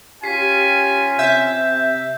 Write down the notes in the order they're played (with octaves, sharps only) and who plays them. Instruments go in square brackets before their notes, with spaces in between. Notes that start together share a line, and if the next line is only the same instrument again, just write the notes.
[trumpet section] C#4 F4 G#5 [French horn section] G4 [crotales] B6 C7
[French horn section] C3 [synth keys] E5 [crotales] G6